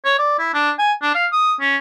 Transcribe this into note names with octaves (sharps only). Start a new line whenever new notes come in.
C#5
D5
E4
D4
G#5
D4
F5
D#6
C#4